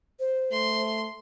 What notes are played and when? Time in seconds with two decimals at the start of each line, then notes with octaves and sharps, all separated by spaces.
0.20 C5
0.52 A3 C6